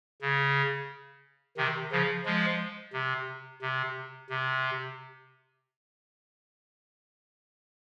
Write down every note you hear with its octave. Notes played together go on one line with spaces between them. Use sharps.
C#3
C3 D#3
C#3 F3
F3 G#3
C3
C3
C3